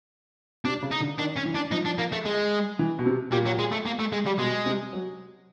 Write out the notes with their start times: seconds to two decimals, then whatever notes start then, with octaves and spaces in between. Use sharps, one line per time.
0.65 C3 D4
0.83 C#3
0.91 D#4
1.00 D3
1.18 D#3 D4
1.36 C#4
1.45 E3
1.55 D4
1.71 F3 D#4
1.85 D4
1.98 A#3
2.12 A3
2.25 G#3
2.79 E3
2.99 B2
3.06 C3
3.32 A#2 G3
3.46 F#3
3.59 G#3
3.72 A3
3.86 A#3
4.00 A3
4.13 G#3
4.26 G3
4.39 B2 G#3
4.66 C3
4.93 F#3